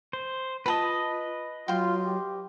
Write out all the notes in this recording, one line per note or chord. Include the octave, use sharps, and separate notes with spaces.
C5
F4 B4 D#5 A5 B5
F#3 F4 G5 C6
G4